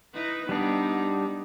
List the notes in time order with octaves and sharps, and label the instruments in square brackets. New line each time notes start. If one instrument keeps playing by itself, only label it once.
[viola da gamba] D#4 E4 B4
[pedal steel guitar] G3 D4 [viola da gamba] B3 D#4